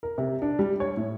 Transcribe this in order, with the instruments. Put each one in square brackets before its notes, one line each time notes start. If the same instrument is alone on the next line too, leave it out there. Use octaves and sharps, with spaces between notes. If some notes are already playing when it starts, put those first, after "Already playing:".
[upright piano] A#4
C3
D4
G3
C#5
A2